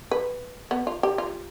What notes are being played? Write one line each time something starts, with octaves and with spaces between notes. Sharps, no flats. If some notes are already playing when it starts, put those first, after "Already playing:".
B4
B3
F4
G4
F4